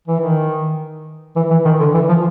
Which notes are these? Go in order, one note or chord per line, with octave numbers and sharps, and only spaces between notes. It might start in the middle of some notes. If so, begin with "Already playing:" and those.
E3
D#3
E3
E3
D#3
D3
E3
F3